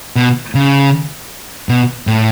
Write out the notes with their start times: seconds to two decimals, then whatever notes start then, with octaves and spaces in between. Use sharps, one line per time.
0.16 B2
0.55 C#3
1.69 B2
2.07 A2